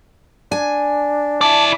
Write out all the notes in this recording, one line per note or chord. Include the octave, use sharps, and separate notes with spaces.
D4 G#5
E4 D5 A5